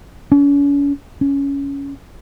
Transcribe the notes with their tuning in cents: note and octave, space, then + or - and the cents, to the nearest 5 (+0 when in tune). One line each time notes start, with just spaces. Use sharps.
C#4 +40
C#4 +10